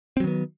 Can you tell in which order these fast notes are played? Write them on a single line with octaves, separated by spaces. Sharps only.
C4 F#3 D#3 B3